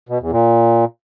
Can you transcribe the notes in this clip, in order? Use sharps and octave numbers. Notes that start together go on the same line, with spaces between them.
B2
E2
A#2